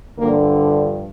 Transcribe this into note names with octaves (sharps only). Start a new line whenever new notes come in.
G2 D3 F3 A#3